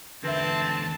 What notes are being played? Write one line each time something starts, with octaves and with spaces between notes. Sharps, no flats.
E2 D3 C4 B4 E5 A5